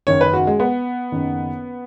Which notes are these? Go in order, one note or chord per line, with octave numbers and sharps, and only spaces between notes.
F#1 F#2 D#3 C#5
B4
F#4
G#3
B3
F#1 F#2 D#3